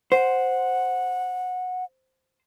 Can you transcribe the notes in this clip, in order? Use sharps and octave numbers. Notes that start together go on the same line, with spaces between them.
C5 F#5